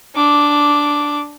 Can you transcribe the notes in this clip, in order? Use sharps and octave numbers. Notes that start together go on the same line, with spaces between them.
D4 D6